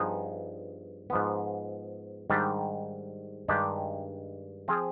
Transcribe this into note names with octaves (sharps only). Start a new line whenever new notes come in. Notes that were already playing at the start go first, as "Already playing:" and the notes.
Already playing: G2 F3 B3 D#4 G#4
G#2 F3 B3
G#2 D#3 G3 D4 G4
G2 D#3 G#3 D4 G4
F3 C4 F4 G#4